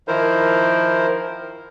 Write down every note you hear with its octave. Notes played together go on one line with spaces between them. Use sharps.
D#3 F3 E4 A#4 C5